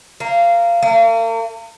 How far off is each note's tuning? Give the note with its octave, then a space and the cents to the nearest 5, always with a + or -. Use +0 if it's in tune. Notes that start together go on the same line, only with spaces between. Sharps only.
A#3 -20
A#3 -45